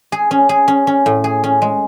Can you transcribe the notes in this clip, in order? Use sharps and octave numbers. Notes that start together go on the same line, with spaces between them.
G#4
C#4
G#4
C#4
C#4
A2
G#4
C#4
G#3